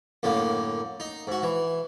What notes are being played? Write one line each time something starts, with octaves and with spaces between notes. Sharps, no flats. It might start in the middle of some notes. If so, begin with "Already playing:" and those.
F#2 A2 D3 A#3
D#4
G#2 F#4
E3